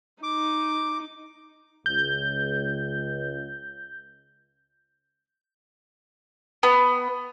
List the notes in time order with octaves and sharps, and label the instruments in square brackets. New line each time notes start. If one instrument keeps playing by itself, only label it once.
[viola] D#4 [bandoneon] D6
[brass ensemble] C#2 [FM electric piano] G6
[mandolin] B3